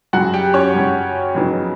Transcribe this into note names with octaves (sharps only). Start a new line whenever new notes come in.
F#2 C#3 F#3 F#4 F#5
G4 G5
C#4 C#5
F#2 C#3 F#3
F2 C#3 F#3 B3 D#4